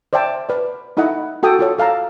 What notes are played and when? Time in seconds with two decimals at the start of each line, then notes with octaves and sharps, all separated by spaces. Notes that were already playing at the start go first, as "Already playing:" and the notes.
0.13 C5 D5 E5 G5 A5
0.49 B4 D5
0.97 D#4 E4 A4 D#5 F#5
1.43 F#4 A4 G5 D#6
1.59 F4 A4 C#5
1.78 A4 F5 A5 A#5